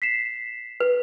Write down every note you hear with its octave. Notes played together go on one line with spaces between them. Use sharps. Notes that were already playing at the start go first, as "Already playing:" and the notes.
B6 C7 E7
B4